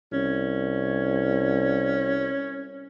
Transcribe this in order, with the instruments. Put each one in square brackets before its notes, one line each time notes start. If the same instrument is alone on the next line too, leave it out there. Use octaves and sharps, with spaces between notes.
[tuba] C2 [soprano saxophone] C#4